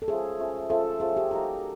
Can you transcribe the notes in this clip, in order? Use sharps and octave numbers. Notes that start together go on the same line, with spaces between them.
A4
F3 A3 C#4 G#4
F3 A3 C#4
F3 A3 C#4 A4
F3 A3 C#4 G#4
G4
A#3 D#4 F#4 G4 A#4